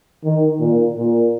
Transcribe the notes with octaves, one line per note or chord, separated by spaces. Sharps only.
D#3
A#2
A#2